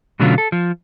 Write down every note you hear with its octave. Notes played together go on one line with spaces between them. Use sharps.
B2 D3 F#3 A3 C#4 F4
A4
F3